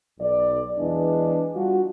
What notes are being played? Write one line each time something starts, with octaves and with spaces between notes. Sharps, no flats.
B1 D5
E2 G#3 D4
G3 F4 F#4